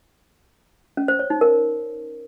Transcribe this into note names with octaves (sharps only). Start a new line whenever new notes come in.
C#4
C5
C#5
D#4
A#4